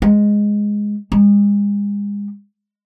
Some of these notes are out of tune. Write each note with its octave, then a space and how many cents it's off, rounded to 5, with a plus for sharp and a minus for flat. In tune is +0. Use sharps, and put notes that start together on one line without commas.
G#3 -5
G#3 -40